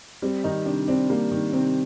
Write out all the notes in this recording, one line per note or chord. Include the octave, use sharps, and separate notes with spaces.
G3 C4
D#3 D#4
C3 D4
C4 D4
G3 A#3
D#3
C3 C4